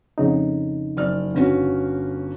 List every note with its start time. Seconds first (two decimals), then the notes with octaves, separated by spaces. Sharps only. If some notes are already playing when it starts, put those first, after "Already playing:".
0.18 F2 C#3 D#4
0.97 F#1 D5 F6
1.35 G1 C#4 F#4